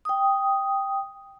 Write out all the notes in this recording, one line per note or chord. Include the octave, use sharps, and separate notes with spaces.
G5 D#6